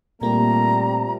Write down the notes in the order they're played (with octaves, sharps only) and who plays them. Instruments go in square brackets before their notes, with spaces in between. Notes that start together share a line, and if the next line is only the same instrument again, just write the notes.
[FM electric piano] A#2 A#3 F4 [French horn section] G3 A3 C4 [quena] A#5